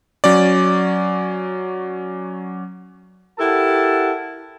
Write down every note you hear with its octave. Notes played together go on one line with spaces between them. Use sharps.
F#3 C#4 D5
E4 G4 A4 A#4 F#5 A5